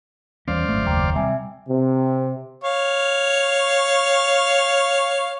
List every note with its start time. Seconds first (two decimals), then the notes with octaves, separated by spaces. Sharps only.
0.48 E2 G3 C#4 C5 D5 F5
0.69 G#1 F#2 A3
0.86 F#1 D#2 G5 A#5 D6
1.15 C3 G3 E5 G#5
1.67 C3
2.64 C#5 F5